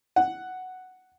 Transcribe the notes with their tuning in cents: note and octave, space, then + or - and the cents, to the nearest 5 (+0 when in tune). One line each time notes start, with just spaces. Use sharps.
F#5 +5